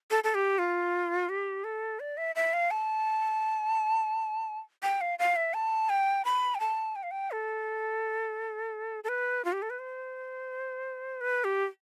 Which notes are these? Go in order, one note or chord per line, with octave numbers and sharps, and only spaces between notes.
A4
A4
G4
F4
G4
A4
D5
E5
E5
F5
A5
G5
F5
F5
E5
A5
G5
B5
G5
A5
G5
F5
G5
A4
A4
B4
F4
G4
A4
B4
C5
B4
G4